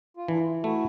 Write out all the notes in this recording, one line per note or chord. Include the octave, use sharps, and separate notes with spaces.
F4
E3 D4 E4
A3 E4 F#4